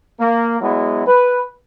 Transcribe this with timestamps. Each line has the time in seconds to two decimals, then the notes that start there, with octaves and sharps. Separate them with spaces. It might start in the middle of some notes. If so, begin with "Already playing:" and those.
0.20 A#3
0.61 F#3 G#3 B3 E4
1.07 B4